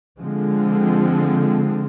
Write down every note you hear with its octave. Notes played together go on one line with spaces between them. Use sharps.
D3 F3 G#3 C4